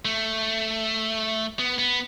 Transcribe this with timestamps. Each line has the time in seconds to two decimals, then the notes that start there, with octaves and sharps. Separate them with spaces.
0.05 A3
1.59 B3
1.78 B3